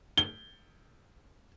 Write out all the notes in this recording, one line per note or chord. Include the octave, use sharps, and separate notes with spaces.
G7